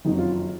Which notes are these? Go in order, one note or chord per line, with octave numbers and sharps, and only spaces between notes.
F#1 F2 D#3 F#3 D#4
F4
F4